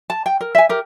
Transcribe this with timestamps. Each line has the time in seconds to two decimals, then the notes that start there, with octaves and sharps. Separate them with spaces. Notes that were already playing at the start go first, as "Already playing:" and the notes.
0.10 A5
0.26 G5
0.41 A#4
0.55 E5 G#5
0.69 G4 A#4